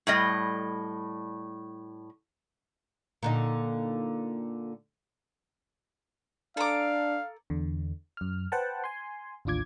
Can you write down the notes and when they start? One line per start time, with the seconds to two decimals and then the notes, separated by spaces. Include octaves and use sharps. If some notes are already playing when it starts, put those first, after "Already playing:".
0.07 A2 G3 D#5
3.23 A#2 D3 D#4
6.57 D4 A4 F5 A#5 D6
7.50 E2 D3
8.17 F#2 F6
8.52 B4 C5 F#5 G5 A5
8.84 G#5 C6
9.45 A1 D#2 D4 F4 D6 G#6